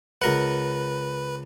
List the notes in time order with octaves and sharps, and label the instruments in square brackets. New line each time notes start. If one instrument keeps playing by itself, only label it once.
[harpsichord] C#2 A#4 F#5 [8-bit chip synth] B4